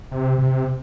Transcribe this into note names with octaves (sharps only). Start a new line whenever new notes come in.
C3
C3